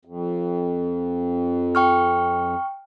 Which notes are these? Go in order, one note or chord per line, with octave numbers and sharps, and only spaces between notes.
F2
G5 C#6 F6